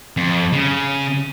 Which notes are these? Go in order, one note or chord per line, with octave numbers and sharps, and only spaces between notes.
F2
C#3